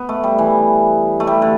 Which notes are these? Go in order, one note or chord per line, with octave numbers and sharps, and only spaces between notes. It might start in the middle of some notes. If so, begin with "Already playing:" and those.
Already playing: B3
A3
G3
E3
A3
G3
D3